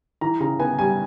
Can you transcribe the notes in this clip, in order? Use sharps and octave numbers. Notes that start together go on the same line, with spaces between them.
E3 A#5
C#3 A#5
B3 G#5
G3 G#5